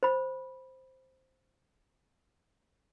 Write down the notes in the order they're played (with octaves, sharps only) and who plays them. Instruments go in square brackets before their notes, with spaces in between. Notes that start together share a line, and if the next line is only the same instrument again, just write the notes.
[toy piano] C5 B5